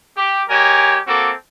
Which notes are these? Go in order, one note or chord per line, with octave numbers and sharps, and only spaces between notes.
G4
G#3 G4 A#4 C#5 G#5
A#3 C4 F#4 A4 D6